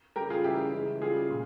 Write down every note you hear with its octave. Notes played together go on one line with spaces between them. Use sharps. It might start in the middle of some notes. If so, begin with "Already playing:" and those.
C#3 G3 G4 A#4
F4 G#4
C#3 E3 G3 E4 G4
C#3 E3 G#3
C#3 E3 G3 F4 G#4
A#2